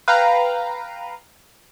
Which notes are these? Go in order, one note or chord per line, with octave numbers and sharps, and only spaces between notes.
B4 F5 G5 A#5